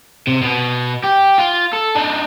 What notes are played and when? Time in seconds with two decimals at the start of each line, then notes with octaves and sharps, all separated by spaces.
0.27 C3
0.42 B2 B3
1.04 G4
1.38 F4
1.73 A4
1.95 D4 D#4